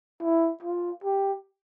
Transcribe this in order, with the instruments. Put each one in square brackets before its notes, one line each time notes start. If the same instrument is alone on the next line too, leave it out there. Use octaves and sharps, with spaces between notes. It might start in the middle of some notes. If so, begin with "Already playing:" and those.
[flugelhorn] E4
F4
G4